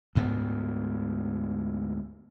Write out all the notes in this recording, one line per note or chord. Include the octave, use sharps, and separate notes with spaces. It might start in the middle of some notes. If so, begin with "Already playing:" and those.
D2 G#2 B3